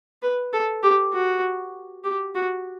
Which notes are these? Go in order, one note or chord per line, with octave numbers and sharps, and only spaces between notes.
B4
A4
G4
F#4
G4
F#4